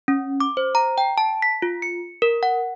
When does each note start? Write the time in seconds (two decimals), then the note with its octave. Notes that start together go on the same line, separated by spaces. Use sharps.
0.08 C#4
0.40 D6
0.57 C5
0.75 A#5
0.98 G5
1.18 A5
1.42 B6
1.62 F4
1.82 C#7
2.22 A#4
2.43 F#5